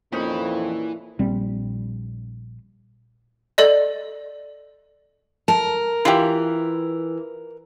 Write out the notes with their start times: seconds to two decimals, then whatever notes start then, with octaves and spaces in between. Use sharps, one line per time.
0.13 F2 A#2 E3 C#4 D#4 B5
1.19 A#1 G3 C4
3.58 A4 D5 D#5
5.48 A#4 A5
6.05 E3 F4 G4